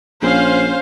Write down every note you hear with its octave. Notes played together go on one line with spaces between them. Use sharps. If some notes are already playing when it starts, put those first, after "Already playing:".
A#1 C#4 C5 F5